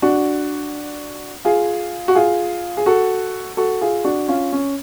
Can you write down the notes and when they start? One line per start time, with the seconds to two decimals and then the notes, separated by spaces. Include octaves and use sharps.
0.02 D4 F#4
1.45 F4 G#4
2.08 F#4
2.15 F4 G#4
2.77 G#4
2.86 F#4 A4
3.57 F#4 A4
3.81 F4 G#4
4.04 D4 F#4
4.28 C#4 F4
4.53 C#4